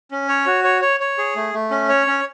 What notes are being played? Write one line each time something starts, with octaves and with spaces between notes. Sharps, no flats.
C#4
C#5
F#4
C#5
C#5
C#5
G#4
A3
A3
C#4
C#5
C#4